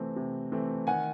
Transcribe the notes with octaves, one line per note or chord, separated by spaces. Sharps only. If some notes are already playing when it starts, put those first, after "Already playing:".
Already playing: C3 E3 A3 C4
C3
E3 A3 C4
D#3 F#5 G#5